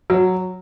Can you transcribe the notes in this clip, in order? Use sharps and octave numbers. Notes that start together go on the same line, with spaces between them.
F#3